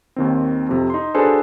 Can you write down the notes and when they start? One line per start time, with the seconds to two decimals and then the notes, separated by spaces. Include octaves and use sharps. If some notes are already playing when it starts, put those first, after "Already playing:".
0.16 D#2 D#3 C4
0.69 F2 C3
0.90 D#4 C6
1.14 D4 F#4 G#4 A4 B4 C5